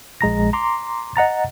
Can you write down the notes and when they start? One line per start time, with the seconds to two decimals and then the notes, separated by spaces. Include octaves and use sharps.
0.21 A#1 G#3 A#5 A#6
0.53 A#5 C6 D6
1.16 D#5 F#5 A#5 A6